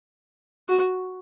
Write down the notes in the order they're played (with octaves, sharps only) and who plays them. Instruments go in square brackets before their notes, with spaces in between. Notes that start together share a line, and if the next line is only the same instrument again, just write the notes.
[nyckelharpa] F#4